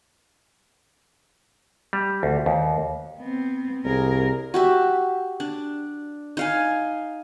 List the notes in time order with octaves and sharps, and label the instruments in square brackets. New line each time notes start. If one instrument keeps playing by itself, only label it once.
[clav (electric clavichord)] G3
D2
D#2
[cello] B3 C4
[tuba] C2 [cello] G#4 A#4
[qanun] F#4 G4 E5
D4
D#4 F5 G#5